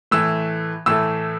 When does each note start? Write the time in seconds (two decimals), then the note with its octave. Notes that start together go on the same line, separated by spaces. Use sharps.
0.11 A2 E3 A3 E6
0.86 A2 E3 A3 E6